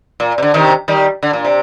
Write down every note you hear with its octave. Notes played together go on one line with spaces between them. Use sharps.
A#2
C3
D3
C3 D#3
D#3 G3
D3
A#2
C3